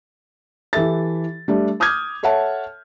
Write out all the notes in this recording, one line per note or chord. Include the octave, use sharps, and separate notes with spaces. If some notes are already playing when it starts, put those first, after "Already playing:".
E3 G4 A4 E5 A6
G3 A3 D4
D6 D#6 F6 G6 G#6
A4 C#5 E5 F#5 A5